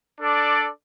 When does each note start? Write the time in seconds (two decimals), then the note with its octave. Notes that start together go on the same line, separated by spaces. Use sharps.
0.19 D4 A4 D5